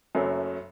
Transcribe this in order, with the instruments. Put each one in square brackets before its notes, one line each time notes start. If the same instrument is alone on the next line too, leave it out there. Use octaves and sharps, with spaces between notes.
[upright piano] F#1 F#2 F#3 A3